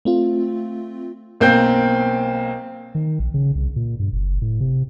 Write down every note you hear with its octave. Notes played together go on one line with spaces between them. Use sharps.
A3 C4 F4
B1 A#3 C4 G5 G6
D#3
A#1
C#3
C2
A#2
G2
F#1
A2
C3